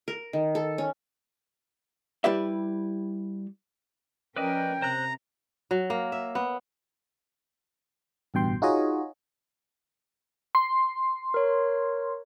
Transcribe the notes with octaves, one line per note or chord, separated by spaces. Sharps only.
A#4
D#3
A4
C#4
G3 E4 G4 B4 D5 E5
F3 C#4 A#4 B4 D5 D#5 G5
C3 C5 A#5 F#6
F#3
A#3
E5
B3
A1 G2 B2 G5 C6
D#4 F4 F#4 G#4 C#5 D#5
C6
A#4 C#5